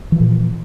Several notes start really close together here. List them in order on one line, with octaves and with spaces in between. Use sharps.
E3 F3 A#2